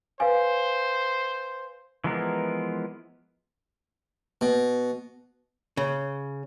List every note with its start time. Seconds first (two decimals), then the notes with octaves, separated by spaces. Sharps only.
0.20 B4 C5 F5 G#5
2.04 E3 F3 G#3 B3 A#4
4.41 B2
5.77 C#3